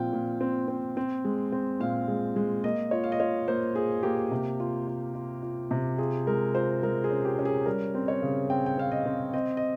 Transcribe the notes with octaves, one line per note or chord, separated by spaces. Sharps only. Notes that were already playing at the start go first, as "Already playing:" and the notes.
Already playing: A#2 F3 C4 F5 G5
A#2
C4
C4
C4
G#3
C4
A#2 F5
G#3
G#3
A#3 D#5
F4 C#5
F5
D#5
F4 C#5
A#3 C5
F4 G#4
A#3 G4
C3
F4
F4
F4
F4
C3
F4 G#4
G#3 A#4
F4 C5
G#3 A#4
G#4
C#4
G4
C#4
G#4
G3 A#4
C4
C#5
C#3
C4 G5
G5
C4 F5
D#5
C4
C4 D#5
D#5